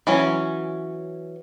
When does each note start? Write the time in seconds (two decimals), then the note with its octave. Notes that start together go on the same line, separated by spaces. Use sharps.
0.07 E3 F#3 C#4